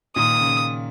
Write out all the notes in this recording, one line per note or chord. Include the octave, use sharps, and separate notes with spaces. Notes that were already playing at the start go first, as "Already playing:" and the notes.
A#2 D#3 D#6
C#3